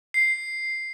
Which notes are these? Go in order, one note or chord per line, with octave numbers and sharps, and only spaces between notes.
C7